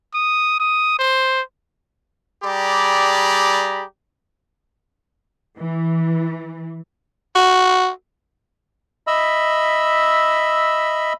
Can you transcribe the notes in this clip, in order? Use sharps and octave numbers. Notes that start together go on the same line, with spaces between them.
D#6
D#6
C5
G3 G4 G#4 D5 A#5 B5
E3
F#4
D#5 E5 B5 E6